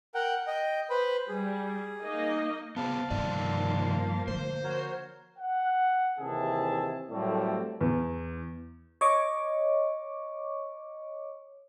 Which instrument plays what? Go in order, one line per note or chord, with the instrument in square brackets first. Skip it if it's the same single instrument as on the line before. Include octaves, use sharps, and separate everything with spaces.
[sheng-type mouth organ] A#4 F#5 G5
D#5 G5
B4 C5 B5
[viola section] G3 [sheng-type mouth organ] G#4
[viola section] A#3 D#4 D#5
[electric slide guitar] B3 G#4 C5 [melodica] F5 A5
[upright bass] G2 [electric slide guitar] C3 D#3 D5 [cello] F3 A#3
[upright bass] D3 [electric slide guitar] C5
[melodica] F#4 A#4 C#5
[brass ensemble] F#5
D#2 C3 E3 G#4 E5 A5
A2 F#3 G3 A3 A#3 C4
[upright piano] E2
[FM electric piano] C#5 D#5 C#6 D6